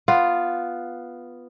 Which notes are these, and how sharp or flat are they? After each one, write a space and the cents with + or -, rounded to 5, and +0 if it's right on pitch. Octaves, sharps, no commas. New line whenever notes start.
B3 +0 F4 +0